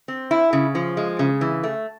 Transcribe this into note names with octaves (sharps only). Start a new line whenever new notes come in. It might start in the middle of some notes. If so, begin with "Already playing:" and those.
C4
E4
C#3
F3
G#3
C#3
E3
A3